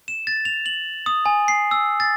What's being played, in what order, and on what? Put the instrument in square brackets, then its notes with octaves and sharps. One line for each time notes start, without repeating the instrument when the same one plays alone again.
[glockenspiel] E7
A6
F7
F#7
D#6
G#5
C7
E6
A6